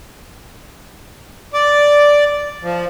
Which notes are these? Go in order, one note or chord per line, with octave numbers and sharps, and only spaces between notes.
D5
F3